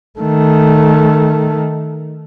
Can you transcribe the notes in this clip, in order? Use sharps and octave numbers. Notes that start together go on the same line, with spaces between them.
D#3 A3